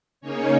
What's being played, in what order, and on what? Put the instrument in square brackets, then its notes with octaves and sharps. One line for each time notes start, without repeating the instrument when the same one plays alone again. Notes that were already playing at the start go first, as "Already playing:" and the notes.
[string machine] C#3 A#3 C#4 D#4 C#5